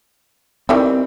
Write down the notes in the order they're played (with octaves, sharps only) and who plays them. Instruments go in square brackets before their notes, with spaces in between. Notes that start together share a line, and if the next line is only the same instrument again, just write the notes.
[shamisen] D#3 E3 G3 [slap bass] C4